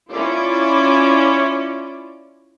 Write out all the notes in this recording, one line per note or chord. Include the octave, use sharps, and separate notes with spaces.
C#4 E4 F4 D5